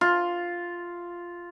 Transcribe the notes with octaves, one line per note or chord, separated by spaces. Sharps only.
F4